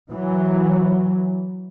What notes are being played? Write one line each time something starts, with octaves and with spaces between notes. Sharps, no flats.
E3 F#3